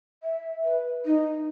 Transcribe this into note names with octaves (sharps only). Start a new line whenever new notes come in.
E5
B4
D#4